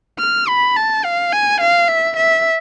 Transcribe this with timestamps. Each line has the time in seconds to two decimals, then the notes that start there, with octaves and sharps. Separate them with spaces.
0.20 F6
0.48 B5
0.77 A5
1.04 F5
1.33 G#5
1.61 F5
1.88 E5
2.17 E5